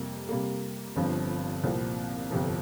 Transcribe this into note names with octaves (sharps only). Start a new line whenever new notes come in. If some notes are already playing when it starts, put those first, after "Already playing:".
Already playing: F2 C3 G3 A#3
C3 G3 A#3
G1 G2 F3 C4
C2 A#2 F3 C4
G1 F2 C3 F3